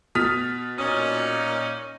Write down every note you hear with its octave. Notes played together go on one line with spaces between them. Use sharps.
B2 D#6 F6 B6
A#2 C#4 D#4 D#6